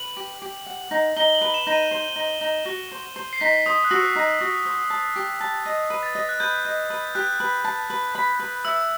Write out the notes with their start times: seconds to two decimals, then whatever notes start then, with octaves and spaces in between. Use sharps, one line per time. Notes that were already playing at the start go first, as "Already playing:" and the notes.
Already playing: B4 F#7
0.17 G4
0.42 G4
0.66 F#5
0.91 D#4
1.16 D#4 G7
1.35 F#7
1.41 B4
1.54 E7
1.67 D#4
1.72 D#7
1.91 C5
2.16 D#4
2.41 D#4
2.65 F#4
2.92 C5
3.16 C5
3.33 C7
3.41 D#4 B6
3.66 C5 D#6
3.84 F#6
3.90 F#4 E6
4.16 D#4
4.41 F#4
4.65 C5
4.90 A5
5.16 G4
5.40 A5
5.65 D#5
5.90 B4
6.03 A6
6.15 D#5
6.29 F#6
6.40 B4 G6
6.65 D#5
6.90 B4
7.15 G4 F#6
7.40 B4
7.65 A5
7.90 B4
8.15 B5
8.39 B4
8.65 E5 E6